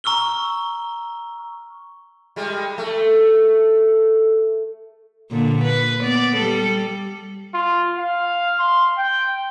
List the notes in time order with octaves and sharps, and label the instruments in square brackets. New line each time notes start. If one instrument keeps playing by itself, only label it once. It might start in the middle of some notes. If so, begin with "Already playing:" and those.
[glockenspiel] A#5 C#6 E6 F6 G7
[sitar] G3 G#3
A3
[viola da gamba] A#2 D3
B4
B3 D5
G3 A4
[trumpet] F4
F5
C6
G5